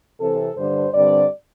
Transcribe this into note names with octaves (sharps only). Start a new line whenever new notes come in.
C3 E3 C4 A4
G2 D3 G3 D4 C5
G2 D3 G3 C4 D5